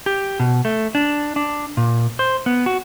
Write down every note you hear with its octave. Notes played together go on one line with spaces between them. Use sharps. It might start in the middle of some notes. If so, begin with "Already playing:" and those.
G4
B2
A3
D4
D4
A#2
C5
B3
F#4